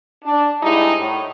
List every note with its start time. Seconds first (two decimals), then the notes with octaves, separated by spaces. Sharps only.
0.24 D4
0.62 G#2 G3 G#3 D#4 E4
1.00 A2